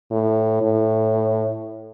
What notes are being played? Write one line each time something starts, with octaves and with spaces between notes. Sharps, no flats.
A2
A2